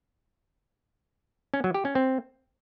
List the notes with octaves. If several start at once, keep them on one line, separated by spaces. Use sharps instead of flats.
C#4
F#3
G4
C#4
C4